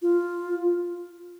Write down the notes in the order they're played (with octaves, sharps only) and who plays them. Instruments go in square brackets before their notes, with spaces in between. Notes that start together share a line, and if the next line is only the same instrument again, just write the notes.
[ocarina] F4